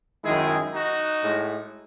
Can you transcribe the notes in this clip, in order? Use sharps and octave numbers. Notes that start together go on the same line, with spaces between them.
F#2 D#3 G#3 E4 G#4
D#4 F#4
A2 G#3